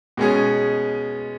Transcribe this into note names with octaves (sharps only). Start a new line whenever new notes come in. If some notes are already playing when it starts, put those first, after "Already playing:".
B2 G#3 C#4 G#4